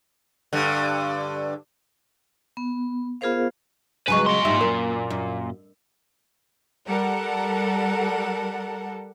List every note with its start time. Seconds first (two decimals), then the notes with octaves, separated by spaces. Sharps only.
0.53 G2 D3
2.57 B3
3.21 B3 F4 G#4 A#4 C5 F5
4.08 C#3 F#3 G#3 B4 G#5 C#6
4.27 A#2 C6
4.45 G#2 G3 E5
4.61 F#2 A#4
5.10 F#2
6.87 G3 A4 A#4 F#5